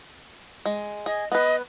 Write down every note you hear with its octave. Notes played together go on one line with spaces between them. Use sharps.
G#3
G#4 D#5
B3 B4 D#5